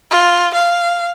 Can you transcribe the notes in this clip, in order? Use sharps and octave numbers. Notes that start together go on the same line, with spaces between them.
F4
F5